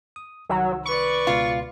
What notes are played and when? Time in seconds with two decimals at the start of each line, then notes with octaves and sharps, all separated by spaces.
0.16 D#6
0.49 C2 D#3 F#3 E6
0.86 B4 D5 C#6
1.27 C#2 B2 F4